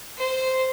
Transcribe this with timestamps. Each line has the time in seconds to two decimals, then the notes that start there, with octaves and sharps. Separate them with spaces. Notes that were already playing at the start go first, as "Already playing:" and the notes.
0.17 C5